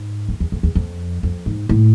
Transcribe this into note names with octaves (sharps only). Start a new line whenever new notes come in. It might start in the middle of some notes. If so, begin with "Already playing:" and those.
Already playing: G#2
F2
E2
F2
E2
F2
F2
G#2
A2